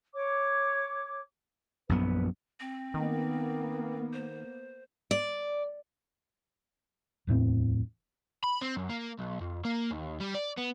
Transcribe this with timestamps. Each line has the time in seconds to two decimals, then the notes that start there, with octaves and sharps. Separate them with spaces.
0.14 C#5 D6
1.89 A#1 F#2 B3 B4
2.60 C4
2.94 D#3 A#3 B3
4.13 C5
5.11 D5
7.27 D1 E2 A2 C4
8.44 B5
8.61 C4
8.76 F#2
8.90 A#3
9.19 B1
9.41 F2
9.65 A#3
9.91 D#2
10.20 G3
10.34 D5
10.58 B3